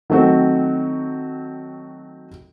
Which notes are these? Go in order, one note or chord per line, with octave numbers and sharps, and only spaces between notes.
D#3 F#3 A3 C4 F#4